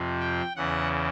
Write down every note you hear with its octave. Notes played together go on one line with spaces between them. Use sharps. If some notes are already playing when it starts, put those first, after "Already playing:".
Already playing: F2 C3 F3
G5
E2 C#3 E3 F#5